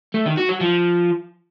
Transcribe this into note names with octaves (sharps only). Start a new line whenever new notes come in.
A3
D#3
F#4
F#3
F3